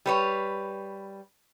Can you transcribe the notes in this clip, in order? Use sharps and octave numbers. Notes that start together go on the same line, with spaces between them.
G3 B4 C#5